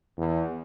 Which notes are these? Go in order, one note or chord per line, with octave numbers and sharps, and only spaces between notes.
E2